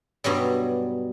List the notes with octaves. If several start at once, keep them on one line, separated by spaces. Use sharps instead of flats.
G2 B2 F#3 G3